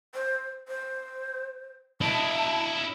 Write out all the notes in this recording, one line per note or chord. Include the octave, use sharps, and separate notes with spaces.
C5
C5
E4 D#5 A5